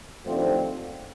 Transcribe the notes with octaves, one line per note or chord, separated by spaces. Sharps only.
D#2 D3 F3 A3 C4